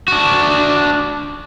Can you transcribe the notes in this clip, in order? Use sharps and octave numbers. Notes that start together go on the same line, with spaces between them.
D4 F#4